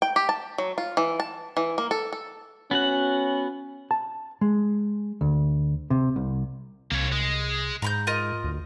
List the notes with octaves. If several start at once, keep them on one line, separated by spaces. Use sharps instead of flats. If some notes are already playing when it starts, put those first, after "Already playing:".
G5
G4
A5
F#3
F4
E3
A5
E3
A#3
A4
A4
B3 C#4 F#4 F#5
A5
G#3
D2
C3
C2
C2 A#3 C#5
G#3
G#2 A#5 B5 G6
F4 A#4 D#5
D2